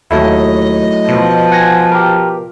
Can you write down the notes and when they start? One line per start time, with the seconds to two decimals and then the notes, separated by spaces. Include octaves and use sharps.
0.11 D#2 F#3 A3 E4 D#5
1.08 B2 F3
1.52 F#5 G#5 A#6
1.92 G4 A#4